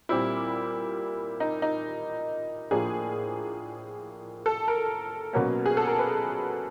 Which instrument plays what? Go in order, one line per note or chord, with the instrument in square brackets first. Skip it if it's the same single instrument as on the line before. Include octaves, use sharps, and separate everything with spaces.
[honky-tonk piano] A#2 G3 C4 E4
D#4
D#4
A2 F3 A#3 D4 G#4
A4
A#4
B2 F#3 A#3 C#4
G#4
A4
A#4
B4